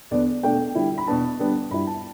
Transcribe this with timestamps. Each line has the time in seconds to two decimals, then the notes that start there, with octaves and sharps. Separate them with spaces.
0.11 E2 D3 B3 D4 D5
0.43 B2 A3 D4 G5
0.75 D3 G3 E4
0.98 B5
1.07 E2 B2 B3 D4 A5
1.39 D3 G3 B3 D4
1.71 G2 G3 E4 B5
1.87 A5